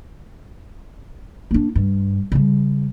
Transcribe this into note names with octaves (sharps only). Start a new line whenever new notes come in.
A#3 D4
G2
C#3 G3